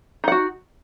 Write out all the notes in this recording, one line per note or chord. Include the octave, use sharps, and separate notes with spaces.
D#4 F#4 F#5